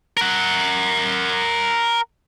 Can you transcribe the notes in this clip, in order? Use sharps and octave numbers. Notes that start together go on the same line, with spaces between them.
A#4 F#5